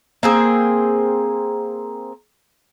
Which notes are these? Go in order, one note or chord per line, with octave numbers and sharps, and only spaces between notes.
A#3 C4 G#4